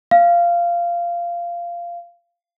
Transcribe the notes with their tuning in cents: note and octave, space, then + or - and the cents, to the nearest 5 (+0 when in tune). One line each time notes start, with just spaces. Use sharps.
F5 -15